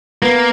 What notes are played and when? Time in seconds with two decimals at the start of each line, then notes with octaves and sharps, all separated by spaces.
0.22 A#3 B3